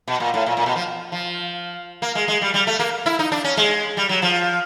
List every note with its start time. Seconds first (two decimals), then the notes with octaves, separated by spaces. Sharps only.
0.08 B2
0.20 A#2
0.34 A2
0.46 A#2
0.57 A#2
0.66 B2
0.76 F3
1.12 F3
2.02 A#3
2.15 G#3
2.28 G#3
2.42 G3
2.54 G3
2.67 A3
2.79 A#3
3.06 E4
3.19 D#4
3.32 D4
3.44 C#4
3.57 G#3
3.97 G3
4.09 F#3
4.22 F3